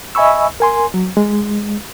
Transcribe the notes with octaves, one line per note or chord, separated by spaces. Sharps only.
D#5 E5 G#5 B5 C#6 E6
A#4 G#5 C6
F#3
G#3